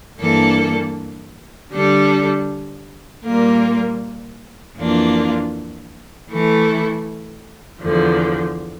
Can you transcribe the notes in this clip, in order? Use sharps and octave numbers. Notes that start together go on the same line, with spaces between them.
G2 E3 A#3 D4 A4
D3 G3 D4 A4
A#2 G3 A#3 F4 A#4
F2 E3 A#3 D4 F4
E3 A3 E4 A4
E2 D3 F3